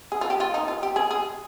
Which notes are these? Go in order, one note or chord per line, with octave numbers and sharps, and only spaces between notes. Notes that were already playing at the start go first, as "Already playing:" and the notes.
G#4
F4
G4
F4
D#4
F4
G4
G#4
G#4